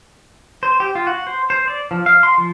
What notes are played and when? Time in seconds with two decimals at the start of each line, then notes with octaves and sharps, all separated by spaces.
0.63 C5
0.80 G4
0.95 F4
1.07 F#4
1.27 C5
1.50 C5
1.68 D5
1.91 F3
2.06 F5
2.23 C6
2.38 F3